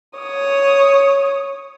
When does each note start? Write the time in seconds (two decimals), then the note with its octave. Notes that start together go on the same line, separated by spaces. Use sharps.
0.17 C#5 D#6